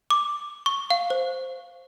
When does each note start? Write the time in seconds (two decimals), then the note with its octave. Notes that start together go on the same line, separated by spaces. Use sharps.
0.10 D6
0.66 C#6
0.90 F5
1.10 C5